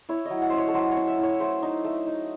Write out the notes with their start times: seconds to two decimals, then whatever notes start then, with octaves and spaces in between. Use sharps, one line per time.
0.09 E4 C#5
0.25 F#3 D#5
0.42 F#5
0.50 C#4 C5
0.58 C#5
0.68 A4
0.74 F#3 C5
0.91 C#5
0.96 C#4
1.07 E5
1.18 E4
1.23 C#5
1.40 A3 C5
1.62 D#4
1.84 A3
2.07 D#4